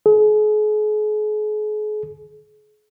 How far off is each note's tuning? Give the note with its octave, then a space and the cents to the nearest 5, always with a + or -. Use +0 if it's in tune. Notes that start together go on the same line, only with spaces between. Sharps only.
G#4 +40